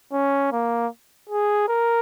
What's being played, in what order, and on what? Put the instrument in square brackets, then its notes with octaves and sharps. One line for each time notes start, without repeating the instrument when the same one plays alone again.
[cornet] C#4
A#3
G#4
A#4